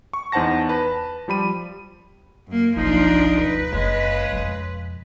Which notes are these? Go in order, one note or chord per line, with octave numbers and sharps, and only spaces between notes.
C#6
E2 D#4 C5 F#5 A5 A#6
B4 A5
F3 G3 B5 D#7
F#2 A#3
F#1 B1 F3 D4 D#4
D2 B4
F#1 C#3 G#3
F2 B2